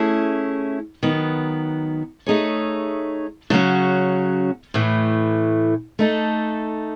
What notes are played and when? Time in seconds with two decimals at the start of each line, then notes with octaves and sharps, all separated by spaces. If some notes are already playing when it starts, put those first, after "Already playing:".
Already playing: A3 C#4 E4 G#4
1.03 D#3 F#3 B3
2.26 A3 D#4 G#4 C#5
3.50 C#3 F#3 C#4 F#4
4.74 A2 E3 A3
5.99 A3 D#4 A4